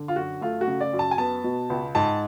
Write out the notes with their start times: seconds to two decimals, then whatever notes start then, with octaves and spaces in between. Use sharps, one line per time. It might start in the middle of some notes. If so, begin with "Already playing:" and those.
Already playing: D3
0.08 F4
0.16 F#2 F#4
0.41 A3 F4
0.61 F#4
0.67 C#3
0.81 D5
0.93 F#2
0.99 A5
1.11 G#5
1.18 B3 A5
1.44 B2
1.70 C#2
1.95 G#2 A5